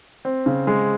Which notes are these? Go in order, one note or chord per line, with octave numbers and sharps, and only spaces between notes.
C4
C#3
G#3